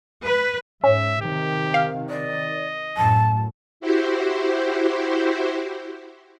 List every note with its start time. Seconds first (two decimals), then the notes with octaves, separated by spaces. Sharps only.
0.21 B4
0.84 G#2 C#4 E5
1.21 C3 D#3 G4
1.74 F5
2.09 D5 D#5
2.97 F#2 A2 A5
3.80 E4 F#4 G4 C5